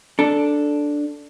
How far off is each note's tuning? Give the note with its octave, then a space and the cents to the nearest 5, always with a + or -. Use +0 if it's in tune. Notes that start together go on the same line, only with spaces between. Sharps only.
D4 +0 A4 +0